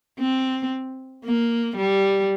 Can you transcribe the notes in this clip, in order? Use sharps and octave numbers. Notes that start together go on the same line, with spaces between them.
C4
A#3
G3